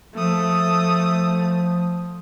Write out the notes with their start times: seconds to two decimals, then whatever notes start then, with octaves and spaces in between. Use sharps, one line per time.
0.15 F3 A3 D#6